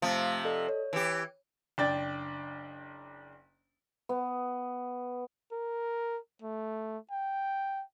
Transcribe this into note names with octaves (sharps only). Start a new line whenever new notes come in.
C3 F3 A3 F5 A6
A4 D5 D#5
C#5
E3 G4
F#1 D4 D5 G5 A6
B3
A#4
A3
G5